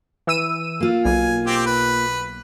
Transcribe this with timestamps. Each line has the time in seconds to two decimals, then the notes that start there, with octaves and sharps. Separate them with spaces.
0.27 E3 E6 D#7
0.80 A#3 F4
1.05 B1 G#5
1.46 C4 G4
1.66 B4